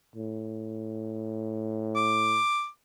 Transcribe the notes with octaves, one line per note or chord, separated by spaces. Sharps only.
A2
D6